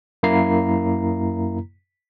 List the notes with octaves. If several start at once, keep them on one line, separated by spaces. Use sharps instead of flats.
F#2 A#3 E4 A#5 C7